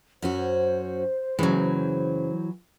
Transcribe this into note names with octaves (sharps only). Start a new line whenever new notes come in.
F#2 C#4 F#4 C5
F#2 C#3 E3 F#3 G#3